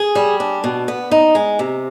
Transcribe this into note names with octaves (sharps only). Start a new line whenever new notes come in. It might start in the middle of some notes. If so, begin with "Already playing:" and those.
Already playing: G#4
G3
D4
B2
B3
D#4
G#3
C3